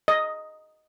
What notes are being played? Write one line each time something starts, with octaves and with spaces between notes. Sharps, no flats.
D#5